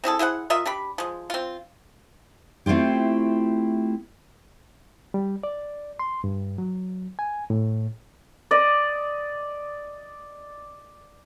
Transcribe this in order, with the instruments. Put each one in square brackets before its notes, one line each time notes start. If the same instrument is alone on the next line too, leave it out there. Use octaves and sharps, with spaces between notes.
[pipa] C4 E4 G#4 A4
E4 G#4 C5 F#5
F4 A#4 D#5 E5
D4 G4 B5
F3 G#3
C4 F4
[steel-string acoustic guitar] A3 C4 E4 F4 G4
[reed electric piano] G3
D5
C6
G2
F#3
G#5
A2
[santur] D5 D#5